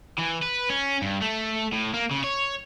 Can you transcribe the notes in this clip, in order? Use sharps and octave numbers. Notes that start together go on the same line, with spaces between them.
E3
B4
C#4
G2
A3
A2
A#3
C#3
C#5